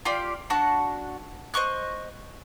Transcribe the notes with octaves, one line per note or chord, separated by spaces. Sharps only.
F4 G4 D5 F5
D4 F#4 F#5 A5
C5 D#5 C#6 F#6